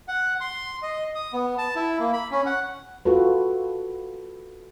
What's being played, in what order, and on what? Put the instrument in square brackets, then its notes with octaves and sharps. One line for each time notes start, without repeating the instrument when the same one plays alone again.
[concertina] F#5
C6
D#5
D#6
B3
A5
E4
A#3
B5
C#4
F#5
[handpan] F4 F#4 A4 B4